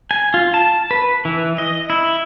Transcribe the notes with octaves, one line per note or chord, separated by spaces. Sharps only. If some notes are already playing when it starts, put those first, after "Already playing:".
G#5
F4
A5
B4
E3
D#5
E4